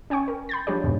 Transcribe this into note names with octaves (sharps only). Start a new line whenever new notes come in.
C#4 G5 G#5 C#6
A#4
B5 G6 A6
F3 D4 G4 C#5
F2 G#2 B2 E3